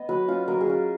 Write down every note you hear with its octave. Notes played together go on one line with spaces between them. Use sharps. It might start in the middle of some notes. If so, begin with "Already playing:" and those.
Already playing: B3 D#5
F#3 B4
C#4 F4
F#3 A#4
G#4
C#4 F4